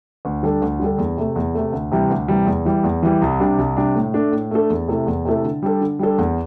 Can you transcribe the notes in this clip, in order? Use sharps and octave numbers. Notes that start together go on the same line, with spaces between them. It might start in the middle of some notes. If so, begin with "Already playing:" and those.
D2
D3 G3 D4 A4
D2
D3 G3 D4 A4
E2
C3 A3
E2
C3 A3
D2
C3 E3 G3
D2
C3 E3 G3
E2
E3 G3
E2
E3 G3
C2
C3 G3 D4
C2
C3 G3 D4
A2
A3 D4 A4
A2
A3 D4 A4
E2
C3 A3 E4 A4
E2
C3 A3 E4 A4
D3
G3 D4 A4
D3
G3 D4 A4
E2